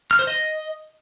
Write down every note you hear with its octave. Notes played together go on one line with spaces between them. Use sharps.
F6
C5
D#5